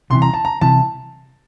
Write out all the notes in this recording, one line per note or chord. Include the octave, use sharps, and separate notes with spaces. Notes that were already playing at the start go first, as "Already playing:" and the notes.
C2 C3 E3 C6
A#5
A5
A#5
C2 C3 E3 A5